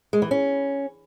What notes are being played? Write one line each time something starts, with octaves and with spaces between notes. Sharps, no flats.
G#3
E3
C#4